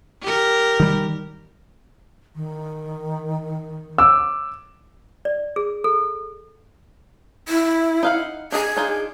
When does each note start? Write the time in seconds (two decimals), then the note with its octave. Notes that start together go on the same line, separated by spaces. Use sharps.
0.22 G4 A#4
0.80 D#3 G3
2.35 D#3
3.98 D6 E6
5.25 D5
5.56 G#4
5.84 A4
7.48 E4
8.03 D#4 F5 F#5
8.52 D4 G#4 D#5 A#5
8.76 D4 D#4 F4